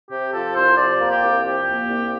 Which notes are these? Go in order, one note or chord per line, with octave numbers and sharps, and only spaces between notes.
C3 G4
F3 A4
C2 C5
F3 D5
A#3
G4
C2
F3 G4
A#3
C2